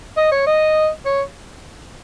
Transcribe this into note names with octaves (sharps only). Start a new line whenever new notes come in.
D#5
C#5
D#5
C#5